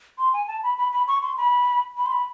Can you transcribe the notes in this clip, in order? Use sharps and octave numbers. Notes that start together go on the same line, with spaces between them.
C6
G#5
A5
B5
B5
B5
C#6
C6
B5
B5
C6
B5